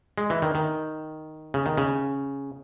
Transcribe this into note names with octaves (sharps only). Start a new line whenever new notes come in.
G#3
E3
D#3
D#3
C#3
D#3
C#3